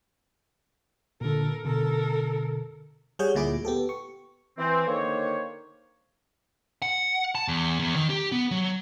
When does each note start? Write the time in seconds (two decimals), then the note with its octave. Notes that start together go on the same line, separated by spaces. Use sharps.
1.21 A#2 D3 A4 A#4
1.65 B2 D3 A4 A#4
3.19 G3 G#4 C#5 F#5 G6
3.35 D2 A#2 E4 G#4 D6
3.65 B3 G4 A4
3.89 C#6
4.58 E3 C4
4.86 D3 D#3 A#3 C5 C#5
6.82 F#5
7.35 A5
7.48 E2
7.79 E2
7.96 D#3
8.10 G4
8.32 B3
8.51 F#3